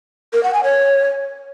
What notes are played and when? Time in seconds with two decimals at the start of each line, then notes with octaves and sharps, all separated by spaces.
0.33 A#4
0.43 F#5
0.54 G#5
0.64 C#5